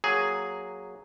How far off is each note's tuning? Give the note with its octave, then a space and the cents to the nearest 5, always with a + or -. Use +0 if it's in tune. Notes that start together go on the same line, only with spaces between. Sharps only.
F#3 +0 A#3 +0 G#4 +0